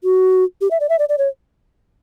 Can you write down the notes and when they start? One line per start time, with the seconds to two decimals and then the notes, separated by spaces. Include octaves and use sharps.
0.04 F#4
0.61 G4
0.71 E5
0.80 D5
0.89 E5
0.99 D5
1.09 D5
1.18 C#5